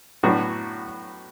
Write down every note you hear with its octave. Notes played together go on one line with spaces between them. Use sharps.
A2 F#3 B3 D4 F#4